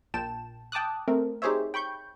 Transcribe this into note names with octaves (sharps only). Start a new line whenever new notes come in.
A#1 A#2 G5 A5 E7
G5 A5 D6 D#6 F#6
A3 C4 A#4
D#4 G4 G#4 C5 C#5 E5
G5 B5 C#6 G6